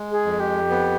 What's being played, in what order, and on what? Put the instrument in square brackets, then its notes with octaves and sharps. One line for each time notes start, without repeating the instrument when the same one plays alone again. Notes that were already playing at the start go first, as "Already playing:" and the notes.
Already playing: [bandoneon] G#3
[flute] G#4
[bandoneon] F2
[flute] G4
[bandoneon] B3